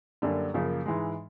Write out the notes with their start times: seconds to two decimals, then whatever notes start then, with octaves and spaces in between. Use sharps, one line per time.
0.22 F#2 D3 G3 A#3
0.54 F#2 C#3 F3 A#3
0.86 G#2 E3 G#3